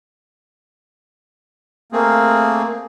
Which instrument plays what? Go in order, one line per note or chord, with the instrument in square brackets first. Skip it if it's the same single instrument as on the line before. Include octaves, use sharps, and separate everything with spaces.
[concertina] A3 C4 G#4 [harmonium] A#3